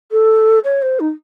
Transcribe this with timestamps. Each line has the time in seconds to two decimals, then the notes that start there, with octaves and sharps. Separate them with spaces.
0.11 A4
0.64 C#5
0.81 C5
0.99 D#4